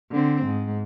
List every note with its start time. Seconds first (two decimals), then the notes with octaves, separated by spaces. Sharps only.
0.11 D3 C4
0.45 G#2